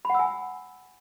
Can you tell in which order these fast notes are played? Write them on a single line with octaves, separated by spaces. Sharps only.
B5 F#5 E6 G#5